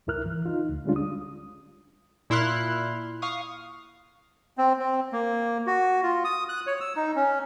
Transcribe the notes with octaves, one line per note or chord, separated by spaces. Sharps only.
C#2 G2 E4 A#4 F6 F#6
E3
D#4 F4
D2
D3 G3 G#3 C#4 D4 F4
D#6
A#2 E4 C6 F6 F#6
F5 C#6 D#6
C4
C4
A#3
F#4
F4
D#6
F#6
C#5
E6
D#4
C#4